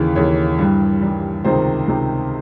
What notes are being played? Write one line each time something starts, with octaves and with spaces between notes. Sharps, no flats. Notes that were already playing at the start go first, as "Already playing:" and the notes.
Already playing: D#2 C#3 E3
D#2 C#3 E3 C#5
G2 E3 G3
G2 E3 G3
C#2 C3 D#3 C5
C#2 C3 D#3